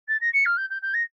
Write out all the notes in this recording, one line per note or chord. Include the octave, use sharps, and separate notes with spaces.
A6
A#6
C#7
F6
G6
G6
G6
A#6